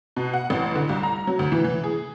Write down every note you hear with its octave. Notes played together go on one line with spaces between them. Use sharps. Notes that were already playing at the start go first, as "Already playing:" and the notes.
B2
F#5
A1
D3
C2
A#5
F#3
D2
E3
E3
G#4